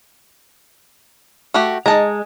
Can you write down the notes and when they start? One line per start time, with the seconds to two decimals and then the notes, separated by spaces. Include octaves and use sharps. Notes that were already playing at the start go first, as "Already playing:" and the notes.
1.54 A3 F#4 G4
1.86 G#3 D#4 A5 A#5